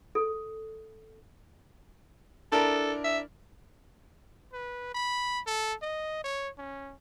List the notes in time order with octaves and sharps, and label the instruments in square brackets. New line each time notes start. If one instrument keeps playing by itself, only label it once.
[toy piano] A4
[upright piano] D4 E4 A#4 [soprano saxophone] A4
[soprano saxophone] E5
[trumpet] B4
B5
A4
D#5
C#5
C#4